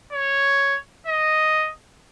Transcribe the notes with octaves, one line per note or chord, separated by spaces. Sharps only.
C#5
D#5